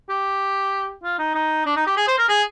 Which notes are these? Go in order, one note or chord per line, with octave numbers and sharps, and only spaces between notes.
G4
F4
D#4
D#4
D4
D#4
G4
G#4
C5
A#4
G#4